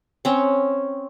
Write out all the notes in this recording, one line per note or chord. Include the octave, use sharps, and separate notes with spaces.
C4 C#4